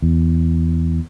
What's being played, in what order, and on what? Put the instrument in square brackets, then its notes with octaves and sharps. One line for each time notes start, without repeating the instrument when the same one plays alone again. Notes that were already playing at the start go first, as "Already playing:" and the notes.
[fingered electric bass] E2